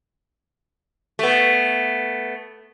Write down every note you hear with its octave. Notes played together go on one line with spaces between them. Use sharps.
A3 B3